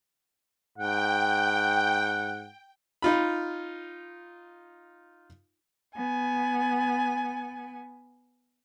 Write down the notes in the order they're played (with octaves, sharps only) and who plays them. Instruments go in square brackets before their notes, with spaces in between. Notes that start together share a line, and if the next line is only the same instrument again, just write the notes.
[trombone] G#2 [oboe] F#5 [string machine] G5
[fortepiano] D#4 F4 B5
[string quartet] B3 G#5